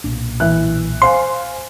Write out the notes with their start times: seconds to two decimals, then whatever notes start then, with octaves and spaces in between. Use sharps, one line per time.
0.04 B1 A#2 D4
0.40 E3 E5 F#6
1.02 C5 F5 G#5 C6